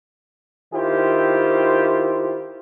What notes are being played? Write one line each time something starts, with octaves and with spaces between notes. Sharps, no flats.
D#3 E4 F4 G4 C5